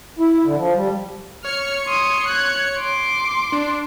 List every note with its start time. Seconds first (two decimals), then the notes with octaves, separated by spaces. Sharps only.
0.19 E4
0.44 D3
0.57 F3
0.75 G3
1.45 C#5 F6 C#7
1.87 C6 D#6
2.28 F#6 G#6
2.80 C6 D6
3.52 D4